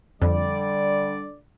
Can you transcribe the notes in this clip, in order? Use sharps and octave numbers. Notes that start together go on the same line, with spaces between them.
F2 D3 G3 D5